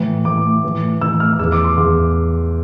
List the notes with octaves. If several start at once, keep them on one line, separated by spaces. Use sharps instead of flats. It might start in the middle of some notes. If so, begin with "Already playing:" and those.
Already playing: A2 E3
A2 E3 D6
A2 E3
A2 E3 E6
F6
E2 E3 E6
D6
C6
E2 E3